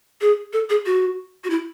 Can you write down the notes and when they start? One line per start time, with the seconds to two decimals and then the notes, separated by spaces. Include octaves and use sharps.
0.21 G#4
0.53 A4
0.70 G#4
0.86 F#4
1.44 F#4
1.50 E4